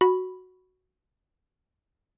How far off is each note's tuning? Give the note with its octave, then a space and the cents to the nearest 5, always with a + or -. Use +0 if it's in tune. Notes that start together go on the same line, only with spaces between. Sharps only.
F#4 +0 B5 +0